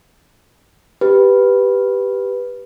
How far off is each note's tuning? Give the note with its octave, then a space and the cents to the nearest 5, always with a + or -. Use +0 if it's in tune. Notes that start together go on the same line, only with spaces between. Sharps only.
G4 +0 B4 -5